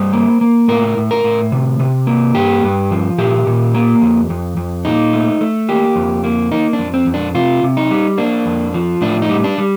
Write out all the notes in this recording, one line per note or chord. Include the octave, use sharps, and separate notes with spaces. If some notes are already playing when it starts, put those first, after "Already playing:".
Already playing: G2 G3 C5
A#3
A#3
A2 A#4
A2
A#4
A2
C3
C3
A#3
G2 G4
G2
F3
A#2 G4
A#2
A#3
F2
F2
F2
A#2 D#4
A3
A3
A#3 G4
F2
A#3
A#3 D#4
D4
F2
C4
F2
D4
C3 F4
C3
D#4
G3
A#3 D4
F2
F3
A2 D4
D#4
G3
D4
G3